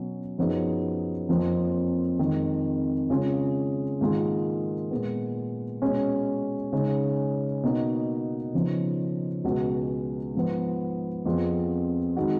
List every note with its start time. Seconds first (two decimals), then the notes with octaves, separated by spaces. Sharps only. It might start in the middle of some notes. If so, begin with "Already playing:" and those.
Already playing: B2 F#3 C#4 F#4
0.38 F#2 F3 B3 D#4 G#4
1.29 F2 F3 A#3
2.19 F2 D#3 G#3
3.10 C#3 G#3 C#4 F4 G#4
4.01 G#2 D#3 A#3 F4 G#4
4.91 A#2 G#3 B3
5.82 B2 G#3 C#4
6.72 C#3 G#3 D#4
7.63 B2 A#3 D#4 F#4
8.53 C#3 F3 B3 D#4
9.44 C#2 B2 G#3 B3 F#4
10.35 G#2 F3 B3
11.25 F2 F3 B3 F4 G#4
12.16 D#3 G#3 D#4 F#4